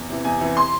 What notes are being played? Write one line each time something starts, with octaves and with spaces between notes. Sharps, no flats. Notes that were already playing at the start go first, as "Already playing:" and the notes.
Already playing: E2
C3 E3
E2 G#5
C3 E3
C6